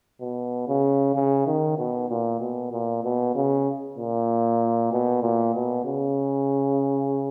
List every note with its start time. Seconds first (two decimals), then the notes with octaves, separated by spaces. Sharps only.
0.21 B2
0.68 C#3
1.15 C#3
1.46 D#3
1.78 B2
2.09 A#2
2.40 B2
2.71 A#2
3.03 B2
3.35 C#3
3.97 A#2
4.92 B2
5.22 A#2
5.55 B2
5.85 C#3